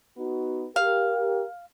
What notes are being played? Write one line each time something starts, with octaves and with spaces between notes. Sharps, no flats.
B3 D#4 F#4
G4 A#4 F5